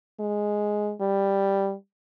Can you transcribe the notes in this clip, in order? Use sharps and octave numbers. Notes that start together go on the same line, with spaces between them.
G#3
G3